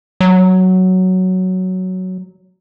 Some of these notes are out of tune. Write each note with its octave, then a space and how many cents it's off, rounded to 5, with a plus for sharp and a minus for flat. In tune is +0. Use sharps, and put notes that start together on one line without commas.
F#3 +5